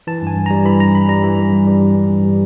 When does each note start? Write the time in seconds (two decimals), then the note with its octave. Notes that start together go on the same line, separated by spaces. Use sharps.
0.07 E3 A5
0.22 G2 G#5
0.36 G2
0.46 G3 A#5
0.65 E3 B5
0.80 G2 A#5
0.94 G2 B5
1.09 G3 A#5
1.24 E3
1.38 G2
1.53 G2
1.67 G3
1.81 E3
1.96 G2
2.10 G2
2.25 G3